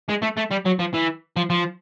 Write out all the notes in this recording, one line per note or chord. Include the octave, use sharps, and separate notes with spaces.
G#3
A3
A3
G3
F#3
F3
E3
F3
F3